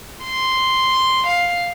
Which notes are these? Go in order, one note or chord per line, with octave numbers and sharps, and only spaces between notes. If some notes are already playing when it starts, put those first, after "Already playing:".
C6
F5